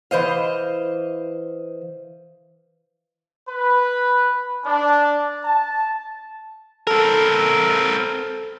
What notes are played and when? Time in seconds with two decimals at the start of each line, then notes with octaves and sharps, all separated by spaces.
0.11 E3 C5 D#5 F5
3.49 B4
4.65 D4
5.45 A5
6.87 C4 A4 A#4